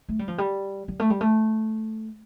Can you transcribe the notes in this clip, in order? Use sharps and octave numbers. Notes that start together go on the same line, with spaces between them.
A3
G3
F3
G3
G3
A3
G3
A3